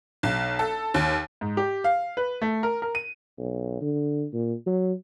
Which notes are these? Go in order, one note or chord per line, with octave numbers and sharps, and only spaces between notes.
B1
A4
D#2
G#2
G4
F5
B4
A3
A#4
A#4
D#7
B1
D3
A#2
F#3